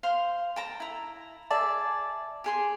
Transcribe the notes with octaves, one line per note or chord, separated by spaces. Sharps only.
C5 F5 C6
G5 A5 A#5
E4 A#5
G#4 D5 E5 A5
G4 G#4 C6